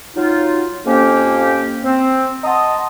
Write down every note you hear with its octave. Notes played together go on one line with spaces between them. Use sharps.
F#3 D#4 F4
F2 A#3 C#4 G4
C4
D#5 F#5 A5 A#5 C6 D#6